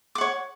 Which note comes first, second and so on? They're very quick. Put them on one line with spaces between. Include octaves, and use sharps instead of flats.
D6 F#5 C#5